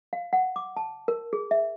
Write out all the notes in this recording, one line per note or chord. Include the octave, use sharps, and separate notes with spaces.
F5
F#5
D6
A5
A#4
G#4
E5